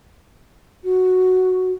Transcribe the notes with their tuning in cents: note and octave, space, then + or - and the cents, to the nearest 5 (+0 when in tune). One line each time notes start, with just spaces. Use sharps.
F#4 -5